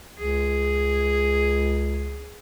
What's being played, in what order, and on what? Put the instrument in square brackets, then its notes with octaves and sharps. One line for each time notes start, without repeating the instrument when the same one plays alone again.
[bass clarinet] C#2 [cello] G#4